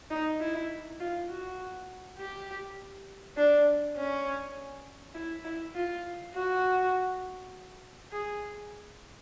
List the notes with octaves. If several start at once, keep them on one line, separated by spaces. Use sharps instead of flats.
D#4
E4
F4
F#4
G4
D4
C#4
E4
E4
F4
F#4
G#4